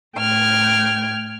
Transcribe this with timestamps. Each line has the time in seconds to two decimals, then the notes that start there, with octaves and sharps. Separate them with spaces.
0.18 A2 G5 F6 G#6